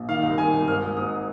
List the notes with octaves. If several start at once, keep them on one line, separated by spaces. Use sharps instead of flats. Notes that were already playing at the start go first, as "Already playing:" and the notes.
Already playing: A#1
D#3 F5
C2
D#3 G#5
C2
G#1 F6
G#1
G#2 D#6